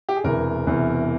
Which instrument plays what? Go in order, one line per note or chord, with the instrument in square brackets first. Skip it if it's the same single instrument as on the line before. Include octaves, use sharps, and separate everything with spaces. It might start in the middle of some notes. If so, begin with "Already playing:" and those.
[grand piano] G4
G#4
E1 E2 C3 A#4
E1 E2 C3